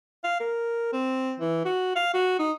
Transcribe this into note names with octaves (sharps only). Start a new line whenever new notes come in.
F5
A#4
C4
E3
F#4
F5
F#4
D#4